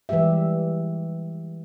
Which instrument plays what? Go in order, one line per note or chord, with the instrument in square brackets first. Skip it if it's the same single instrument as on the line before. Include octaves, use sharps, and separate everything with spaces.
[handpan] E3 G3 G#3 G4 E5